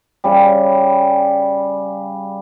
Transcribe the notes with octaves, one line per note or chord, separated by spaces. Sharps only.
C#3 G3